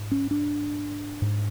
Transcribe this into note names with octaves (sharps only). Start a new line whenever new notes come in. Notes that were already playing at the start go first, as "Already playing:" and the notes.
Already playing: G#2
C#4
D4
G#2